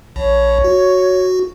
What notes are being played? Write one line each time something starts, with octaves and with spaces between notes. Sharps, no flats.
A#1 C#5
F#4